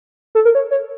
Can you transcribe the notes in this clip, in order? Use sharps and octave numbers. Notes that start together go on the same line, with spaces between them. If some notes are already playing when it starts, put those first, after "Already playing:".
A4
A#4
C#5
C#5